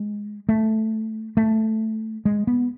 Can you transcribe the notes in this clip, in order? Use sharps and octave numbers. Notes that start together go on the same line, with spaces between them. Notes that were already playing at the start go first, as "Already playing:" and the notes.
Already playing: G#3
A3
A3
G#3
B3